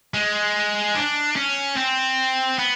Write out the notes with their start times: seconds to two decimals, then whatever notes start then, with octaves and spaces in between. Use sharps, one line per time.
0.14 G#3
0.95 D4
1.36 C#4
1.77 C4
2.59 B3